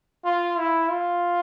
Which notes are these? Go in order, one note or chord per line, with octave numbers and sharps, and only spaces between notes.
F4
E4
F4